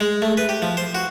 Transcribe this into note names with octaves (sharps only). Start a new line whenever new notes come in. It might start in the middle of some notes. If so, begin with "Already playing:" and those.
G#3
A3
B4
G4
F3
C5
F#4